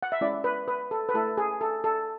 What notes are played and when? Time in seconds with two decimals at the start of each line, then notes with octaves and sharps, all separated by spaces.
0.03 F#5
0.12 E5
0.21 G#3 C#4 E4 D5
0.44 B4
0.68 B4
0.91 A4
1.09 B4
1.14 A3 E4 A4
1.37 G#4
1.61 A4
1.84 A4